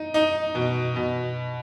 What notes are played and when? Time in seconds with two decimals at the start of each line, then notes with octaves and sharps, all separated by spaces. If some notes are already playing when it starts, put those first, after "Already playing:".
Already playing: D#4
0.14 D#4
0.55 B2
0.96 B2